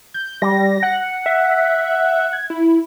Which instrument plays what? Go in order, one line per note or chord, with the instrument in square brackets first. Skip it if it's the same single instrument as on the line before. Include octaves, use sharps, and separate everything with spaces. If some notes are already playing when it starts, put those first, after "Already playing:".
[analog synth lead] G6
[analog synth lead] G3 [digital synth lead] A#6
[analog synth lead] F#5
[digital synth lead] E5
G#6
E4